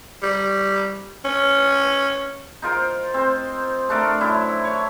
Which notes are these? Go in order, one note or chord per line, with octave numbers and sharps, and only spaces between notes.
G3
C#4
D#4 F4 A#4 C5
C4 C5
A3 D4 A4 A#4
F#2 E4 C6
C#5